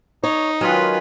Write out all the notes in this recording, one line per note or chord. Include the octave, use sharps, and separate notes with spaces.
D#4 C#5
D#3 F#3 G#3 C#4 F4 B4